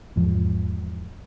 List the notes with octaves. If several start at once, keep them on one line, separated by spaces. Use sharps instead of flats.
E2 G#2 F3